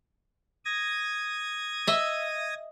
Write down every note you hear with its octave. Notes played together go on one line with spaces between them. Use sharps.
D#6 G#6 A#6
D#5 E5